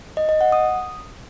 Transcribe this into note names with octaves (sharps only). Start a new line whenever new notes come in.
D#5
D#5
F#5
D#6